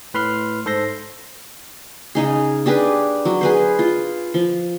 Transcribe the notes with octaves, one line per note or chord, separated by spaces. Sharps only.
A2 B4 B5 C6 F6
G#2 A4 C5 C6 A#6
C#3 D#4 G#4
D4 G4 G#4 B4
F#3
G#4 B4 C5
F4
F3